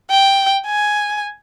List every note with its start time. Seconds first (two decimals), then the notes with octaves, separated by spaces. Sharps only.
0.10 G5
0.67 G#5